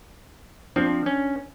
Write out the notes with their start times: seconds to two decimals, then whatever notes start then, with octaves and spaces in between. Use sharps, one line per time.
0.76 F3 C4 D4
1.06 C#4